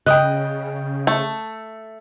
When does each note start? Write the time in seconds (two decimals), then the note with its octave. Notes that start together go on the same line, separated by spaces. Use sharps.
0.06 C#3 D#5 G5 D#6 F#6
1.07 A3